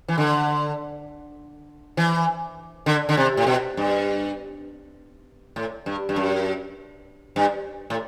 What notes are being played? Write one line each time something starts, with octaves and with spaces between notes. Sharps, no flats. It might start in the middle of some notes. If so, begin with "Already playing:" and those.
E3
D3
E3
D3
D3
C3
A2
B2
G2
A2
G2
G2
F#2
G2
A2